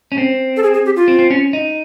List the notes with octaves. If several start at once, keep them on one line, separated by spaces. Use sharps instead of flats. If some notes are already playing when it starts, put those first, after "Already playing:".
C#4
C4
A4
G#4
G#4
G4
F4
C4
C4
C#4
D#4